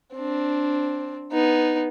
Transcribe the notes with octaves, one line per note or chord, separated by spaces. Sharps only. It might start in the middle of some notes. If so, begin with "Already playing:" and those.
C4 D4
B3 D#4